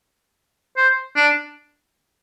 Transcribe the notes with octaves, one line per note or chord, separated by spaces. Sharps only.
C5
D4